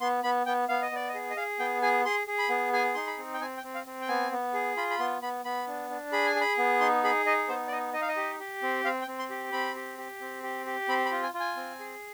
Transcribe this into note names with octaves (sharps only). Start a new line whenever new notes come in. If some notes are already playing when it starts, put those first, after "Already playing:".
B3 C6
B3 B5
B3 G5
B3 F5
D#5
B3 D5
D#5
G#4
D#5
G#4 F5
B3 G5
G#4 G#5
G#4 C6
G#4
B5
B3
G#4 G#5
D#4 C6
B5
C4
G5
C4 G#5
G5
C4
F5
C4
G5
B3 G#5
B3
G#4
F4 B5
B5
B3 C6
B3 B5
B3 B5
D4
D4
G#4 B5
G#5
G#4
B5
B3
D#4 C6
G#4 B5
D#4 D#5
B3 C5
D5
D#4 D#5
D#4 D#5
F5
D#5
G4
G4
C4
C4 F5
G5
C4
C6
G4
C4 B5
G4
G4
C4
G4
G4
C4 B5
B5
F4
G#5
F4
G#5
C4
G#4